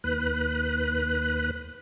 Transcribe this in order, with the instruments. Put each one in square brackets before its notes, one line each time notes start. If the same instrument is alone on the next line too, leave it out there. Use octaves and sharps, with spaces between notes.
[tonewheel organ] D#2 B4 F#6